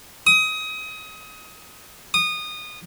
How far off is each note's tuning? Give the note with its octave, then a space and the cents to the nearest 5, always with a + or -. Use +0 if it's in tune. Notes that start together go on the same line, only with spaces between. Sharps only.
D#6 +25
D#6 -20